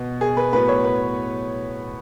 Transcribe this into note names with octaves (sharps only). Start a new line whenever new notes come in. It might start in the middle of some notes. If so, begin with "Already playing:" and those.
Already playing: B2 B3
G#4
B4
A2 F#3 B3 B4
C#5
B4